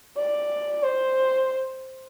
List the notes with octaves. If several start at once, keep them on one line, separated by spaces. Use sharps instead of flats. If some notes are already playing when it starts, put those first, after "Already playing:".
D5
C5